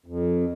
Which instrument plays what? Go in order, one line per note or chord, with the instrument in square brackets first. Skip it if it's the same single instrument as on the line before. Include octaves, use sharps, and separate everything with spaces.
[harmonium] F2